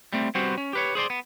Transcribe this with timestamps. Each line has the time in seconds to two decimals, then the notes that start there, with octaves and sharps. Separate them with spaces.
0.13 G3 A3 C4
0.35 G3 B3 C4 F#4 C5
0.58 C#4
0.73 G4 B4 C#5
0.95 G#4 C5 D5 C6
1.10 B3